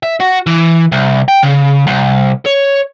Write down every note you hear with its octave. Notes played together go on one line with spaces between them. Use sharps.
E5
F#4
E3
C2
G5
C#3
C2
C#5